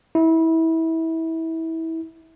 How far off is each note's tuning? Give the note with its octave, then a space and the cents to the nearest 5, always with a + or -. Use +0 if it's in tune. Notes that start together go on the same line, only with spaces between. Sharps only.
E4 -25